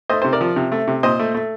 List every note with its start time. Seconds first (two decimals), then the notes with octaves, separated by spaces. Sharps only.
0.10 A3 C5 D#5
0.22 C3 C5
0.33 A#4 D5
0.41 F3
0.56 C3
0.72 A3
0.88 C3
1.03 A#2 C5 D#5
1.19 A3
1.35 A3